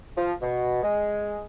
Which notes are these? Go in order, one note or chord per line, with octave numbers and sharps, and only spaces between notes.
F3
B2
G#3